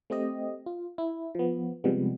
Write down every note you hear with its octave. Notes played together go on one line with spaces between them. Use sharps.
A3 C4 G4 D#5
F4
E4
F3 B3
C3 F3 G3 G#3 B3